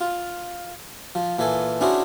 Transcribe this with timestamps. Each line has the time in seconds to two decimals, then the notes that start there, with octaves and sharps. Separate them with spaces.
0.01 F4
1.15 F3
1.39 A#2 E3 A4 G#5
1.81 C#4 D4 E4 F#4 G#4 C5